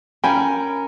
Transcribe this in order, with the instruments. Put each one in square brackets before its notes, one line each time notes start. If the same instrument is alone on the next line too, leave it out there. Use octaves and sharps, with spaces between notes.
[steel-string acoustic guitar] C#4 A#4 [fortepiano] G5 B5 [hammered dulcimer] G#5